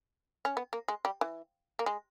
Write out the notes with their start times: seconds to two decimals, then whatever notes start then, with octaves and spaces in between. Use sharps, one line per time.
0.45 C#4
0.57 B3
0.73 A#3
0.88 G#3
1.05 G3
1.21 E3
1.79 A#3
1.86 G#3